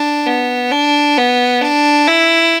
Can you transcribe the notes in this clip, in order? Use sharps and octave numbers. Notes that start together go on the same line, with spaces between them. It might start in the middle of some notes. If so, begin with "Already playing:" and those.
Already playing: D4
B3
D4
B3
D4
E4